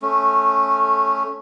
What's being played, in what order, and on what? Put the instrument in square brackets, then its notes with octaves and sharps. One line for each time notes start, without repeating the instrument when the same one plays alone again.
[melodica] A3 C#4